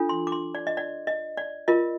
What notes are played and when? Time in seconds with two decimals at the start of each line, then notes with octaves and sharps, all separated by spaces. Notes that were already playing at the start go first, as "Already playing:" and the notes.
Already playing: D4 F4 A4
0.09 C6
0.27 D6
0.32 C6
0.55 D5
0.67 D#5
0.77 D5
1.07 D#5
1.37 D5
1.68 F4 A#4 D#5